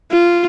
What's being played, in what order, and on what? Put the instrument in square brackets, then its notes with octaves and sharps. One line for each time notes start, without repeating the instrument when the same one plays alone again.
[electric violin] F4